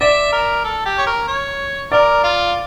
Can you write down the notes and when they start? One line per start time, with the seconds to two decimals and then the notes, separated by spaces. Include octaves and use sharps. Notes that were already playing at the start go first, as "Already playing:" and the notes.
0.01 D5 E5
0.32 A#4
0.64 A4
0.85 G4
0.98 C#5
1.07 A#4
1.28 C#5
1.92 A#4 D5
2.24 F4